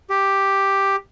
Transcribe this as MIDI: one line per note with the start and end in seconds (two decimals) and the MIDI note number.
0.10 0.96 67